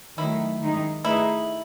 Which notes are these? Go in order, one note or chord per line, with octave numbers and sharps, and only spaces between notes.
D#3 F#3 A3 E4
D#3 G#3 D#4
A3 D#4 E4 G#4 B4